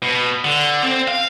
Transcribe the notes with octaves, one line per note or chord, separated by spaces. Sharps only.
B2
D3
C4
F5